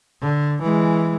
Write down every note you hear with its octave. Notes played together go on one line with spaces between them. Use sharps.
D3
E3 G#3